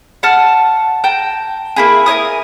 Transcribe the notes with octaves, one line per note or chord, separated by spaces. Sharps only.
F#5 A5 F6
G5 A5 A#5 G6
A#3 E4 G#4
A#4 C#5 G#5 D#6